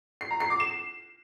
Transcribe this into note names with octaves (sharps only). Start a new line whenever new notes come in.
C7
A#5
C7
D6
E7